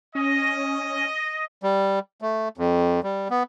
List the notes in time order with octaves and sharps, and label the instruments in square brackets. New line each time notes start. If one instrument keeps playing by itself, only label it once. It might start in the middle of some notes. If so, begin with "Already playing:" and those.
[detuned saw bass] C#4 [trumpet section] D#5
[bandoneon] G3
A3
F2
G3
B3